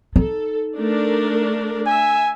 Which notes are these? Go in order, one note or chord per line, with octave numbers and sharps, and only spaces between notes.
D#4 A4
A3 D4 A#4
E5 G#5